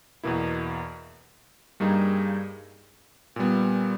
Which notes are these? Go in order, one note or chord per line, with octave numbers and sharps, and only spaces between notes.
E2 B2 A#3 E4
G2 G3 A#3 D#4 G#4
A#2 G3 B3